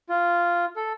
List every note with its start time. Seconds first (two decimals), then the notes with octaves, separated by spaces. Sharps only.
0.09 F4
0.76 A4